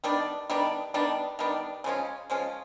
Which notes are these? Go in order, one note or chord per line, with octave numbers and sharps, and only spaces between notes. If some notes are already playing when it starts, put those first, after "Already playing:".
D#3 G3 B3 D4
D#3 G3 B3 D4
D#3 G3 B3 D4
D#3 G3 B3 D4
C#3 F3 G#3 C#4
C#3 F3 G#3 C#4